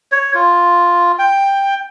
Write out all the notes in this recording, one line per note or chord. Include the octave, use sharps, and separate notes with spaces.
C#5
F4
G5